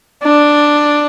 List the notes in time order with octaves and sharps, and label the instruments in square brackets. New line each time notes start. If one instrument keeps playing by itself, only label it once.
[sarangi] D4